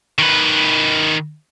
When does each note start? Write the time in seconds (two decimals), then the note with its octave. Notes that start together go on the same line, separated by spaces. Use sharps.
0.19 D#3 B4